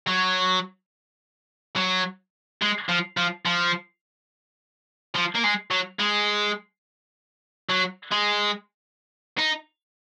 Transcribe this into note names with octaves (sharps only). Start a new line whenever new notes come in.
F#3
F#3
G#3
F3
F3
F3
F3
A#3
G#3
F#3
G#3
F#3
G#3
D#4